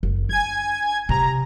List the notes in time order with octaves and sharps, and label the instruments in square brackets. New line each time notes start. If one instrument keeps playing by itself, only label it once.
[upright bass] F#1
[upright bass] D4 [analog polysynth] G#5 G#6
[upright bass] C3 [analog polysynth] A#5